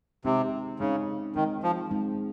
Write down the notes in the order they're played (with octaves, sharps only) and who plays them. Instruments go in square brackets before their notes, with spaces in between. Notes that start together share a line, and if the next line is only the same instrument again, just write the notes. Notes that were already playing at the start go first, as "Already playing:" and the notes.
[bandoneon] C3 [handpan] G#3 C4 D#4
[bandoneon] C#3 [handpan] G#3 C4 D#4
[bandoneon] D#3 [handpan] G#3 C4 D#4
[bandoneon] F3
[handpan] G#3 C4 D#4